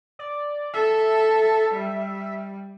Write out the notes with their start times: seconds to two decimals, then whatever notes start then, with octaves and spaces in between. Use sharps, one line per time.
0.19 D5
0.74 A4 E5
1.73 G3